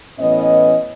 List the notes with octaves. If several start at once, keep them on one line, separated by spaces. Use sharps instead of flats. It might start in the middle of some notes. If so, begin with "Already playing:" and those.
A2 E3 B3 C#4 D#5